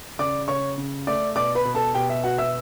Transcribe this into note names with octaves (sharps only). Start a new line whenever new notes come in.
C#3 D5 D6
C#3 C#5 C#6
C#3
A3 D5 D6
B2 D5 D6
B4 B5
B2
A4 A5
B2 G4 G5
E5
B3 F#4 F#5
E5 E6